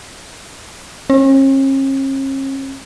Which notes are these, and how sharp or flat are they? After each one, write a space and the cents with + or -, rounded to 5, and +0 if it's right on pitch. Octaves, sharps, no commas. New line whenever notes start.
C#4 -45